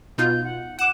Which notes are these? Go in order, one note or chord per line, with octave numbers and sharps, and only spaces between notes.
B2 D#4 F4 G6
F#5
F#5 D6 E7